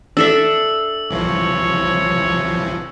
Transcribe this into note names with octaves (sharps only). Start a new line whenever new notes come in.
D4 A4 E5 E6
C2 E3 F3 C#5